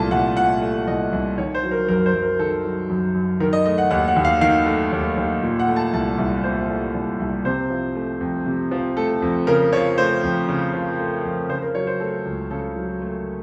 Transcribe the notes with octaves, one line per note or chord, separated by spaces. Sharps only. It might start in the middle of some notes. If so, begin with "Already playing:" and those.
Already playing: C2 A#2 A3 A5
C2 F#5
A#2 F#5
A3
C2 D#5
C2
D#3 C#5
C5
F#3
A#4
F#2 A#4
C5
F#2
A#4
D#3 A4
F#3
F#2
F#2
D#3 A#4
D#5
A3 D#5
F#5
D#2 F#5
F#5
D#2
F5
D#3 F5
A3
D#2
D#2
A#2
F#5
A3
A5
C2 A5
C2
A#2 C5
A3
C2
C2
C3 C5
F3
A3
F2
C3
F3
A3 A4
F2
C#3 A#4
F3 C#5
A3 C5
F2
C#3
F3
A3
F2
C#3 C5
A#4
F#3 C#5
C5
A3 A4
C#2
C#3 A4
F#3
A3